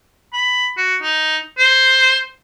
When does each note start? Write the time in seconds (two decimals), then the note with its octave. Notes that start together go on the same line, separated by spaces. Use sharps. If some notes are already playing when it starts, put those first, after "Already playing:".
0.33 B5
0.77 F#4
1.02 D#4
1.58 C5